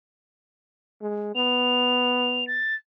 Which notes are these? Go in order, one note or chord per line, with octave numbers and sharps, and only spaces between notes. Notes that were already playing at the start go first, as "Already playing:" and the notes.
G#3
B3 F7
A6